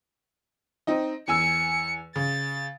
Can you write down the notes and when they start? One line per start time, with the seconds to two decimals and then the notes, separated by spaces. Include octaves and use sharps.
0.87 C4 D#4 D#5
1.28 E2 G#5 E6 C#7
2.16 C#3 A6